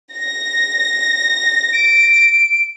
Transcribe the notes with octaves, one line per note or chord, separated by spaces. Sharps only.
A#6
D7